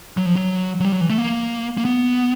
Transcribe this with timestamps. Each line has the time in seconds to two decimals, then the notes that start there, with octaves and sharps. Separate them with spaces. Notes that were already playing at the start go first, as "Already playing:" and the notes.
0.17 F#3
0.26 F3
0.36 F#3
0.80 F#3
0.85 G3
0.92 F#3
1.01 E3
1.10 A3
1.18 A#3
1.77 A#3
1.85 B3